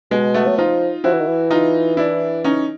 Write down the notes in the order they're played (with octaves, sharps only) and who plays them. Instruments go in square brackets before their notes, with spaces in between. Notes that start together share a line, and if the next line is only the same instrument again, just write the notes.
[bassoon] B2 [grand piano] G#3
[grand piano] A3 B3
[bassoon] F#3
[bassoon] F3 [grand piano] D#4 F4
[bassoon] F3 [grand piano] E4 F#4
[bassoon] E3
D#3
E3
[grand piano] D#4 F4
D4 E4
C#4 D#4